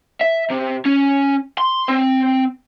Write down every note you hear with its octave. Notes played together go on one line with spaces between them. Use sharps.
E5
C3
C#4
C6
C4